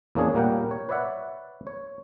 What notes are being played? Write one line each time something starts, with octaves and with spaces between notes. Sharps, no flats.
E2 A#3 C#4 D4 G#4 C#5
A#2 G3 A#3 A#4 F#5 G5
C#5
B4 C#5 D5 E5 F#5
C#5